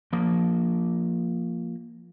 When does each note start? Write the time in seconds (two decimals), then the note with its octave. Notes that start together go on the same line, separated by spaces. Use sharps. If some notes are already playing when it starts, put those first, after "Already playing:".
0.13 F3 A#3